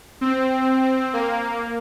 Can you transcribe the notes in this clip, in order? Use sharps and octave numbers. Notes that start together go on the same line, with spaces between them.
C4
A#3